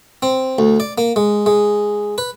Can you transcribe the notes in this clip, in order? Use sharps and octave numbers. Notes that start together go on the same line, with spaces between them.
C4
D2
D5
A#3
G#3
G#3
B4